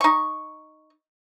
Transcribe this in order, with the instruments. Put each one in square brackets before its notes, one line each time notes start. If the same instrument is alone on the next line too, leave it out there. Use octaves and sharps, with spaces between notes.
[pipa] D#4 C#6